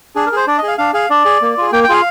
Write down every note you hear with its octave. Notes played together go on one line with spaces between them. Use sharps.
D4 G#4
A#4
G#4 C5
D4 D5
D#5
G#4 F5
D4 F5
G#4 F5
D4 D5
G#4
A#3
F4 G#4
A#3 G5
G5
F4 G#4 F5